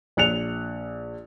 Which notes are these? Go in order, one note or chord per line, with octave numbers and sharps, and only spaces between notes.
A#1 F#6 C#7 F7